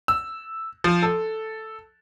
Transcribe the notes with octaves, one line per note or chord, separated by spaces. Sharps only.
E6
F3
A4